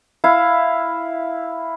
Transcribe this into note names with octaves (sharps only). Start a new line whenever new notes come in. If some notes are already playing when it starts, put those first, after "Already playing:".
E4 F5